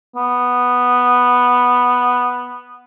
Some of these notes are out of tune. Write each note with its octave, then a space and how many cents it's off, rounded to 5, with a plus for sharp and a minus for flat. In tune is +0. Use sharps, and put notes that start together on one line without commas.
B3 -5